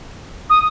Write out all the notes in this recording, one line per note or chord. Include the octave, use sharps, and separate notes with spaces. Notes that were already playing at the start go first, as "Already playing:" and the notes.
D#6